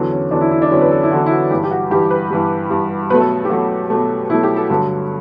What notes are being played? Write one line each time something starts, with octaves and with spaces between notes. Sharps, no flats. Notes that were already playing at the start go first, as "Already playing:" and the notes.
Already playing: E2 D3 F#3
C#4
E2 D3 F#3 D4
E4
E4
D4
E2 D3 F#3 C#4
B4
A4
E4
E2 D3 F#3 F#4
E4
F#4
G2 E3 G3 G4
G4
F#4
G2 E3 G3 G4
B4
G2 E3 G3
G2 E3 G3
B2 F#3 A3 B4
A4
G4
B2 F#3 A3 F#4
B2 F#3 A3
B2 F#3 A3 E4
G4
A4
G2 D3 F#3 A3